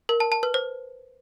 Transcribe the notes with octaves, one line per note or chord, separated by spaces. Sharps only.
A#4
A5
A5
B4
C5